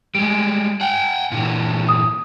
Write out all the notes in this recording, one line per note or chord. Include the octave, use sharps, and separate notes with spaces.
G3 G#3 D7
F#5 G5
A#2 D3 E3
D#6